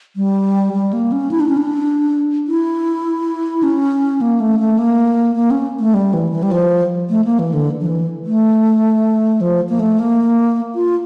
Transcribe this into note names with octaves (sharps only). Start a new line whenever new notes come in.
G3
G3
A#3
C#4
E4
D4
C#4
D4
E4
C#4
A#3
A3
A3
A#3
A#3
C#4
A3
G3
E3
E3
G3
F3
A3
A#3
E3
D3
F3
E3
A3
F3
A#3
A3
A#3
F4